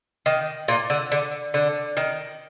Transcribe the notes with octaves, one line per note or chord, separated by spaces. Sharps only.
D#3
A#2
D3
D3
D3
D#3